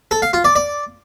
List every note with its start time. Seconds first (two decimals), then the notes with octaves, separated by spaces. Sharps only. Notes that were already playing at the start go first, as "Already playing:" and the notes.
0.11 A4
0.22 F5
0.33 F4
0.44 D5
0.56 D5